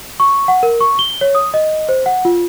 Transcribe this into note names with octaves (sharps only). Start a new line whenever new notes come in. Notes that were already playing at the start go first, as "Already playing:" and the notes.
C#6
F#5
A#4
C#6
G7
C#5
D#6
D#5
C5
F#5
F4